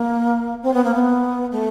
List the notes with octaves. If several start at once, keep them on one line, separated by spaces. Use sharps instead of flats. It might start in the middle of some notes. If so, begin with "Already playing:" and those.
Already playing: A#3
C4
B3
A#3
B3
A3